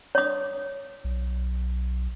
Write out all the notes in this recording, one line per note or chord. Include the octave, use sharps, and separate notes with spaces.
C#5 D#6
B1